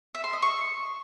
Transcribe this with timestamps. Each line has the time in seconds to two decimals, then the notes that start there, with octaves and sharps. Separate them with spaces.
0.15 E5
0.24 C6
0.33 D#5
0.42 C#6